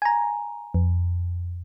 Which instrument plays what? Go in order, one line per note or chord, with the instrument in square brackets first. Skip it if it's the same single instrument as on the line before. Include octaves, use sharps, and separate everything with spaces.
[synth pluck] G#5 A#5
F2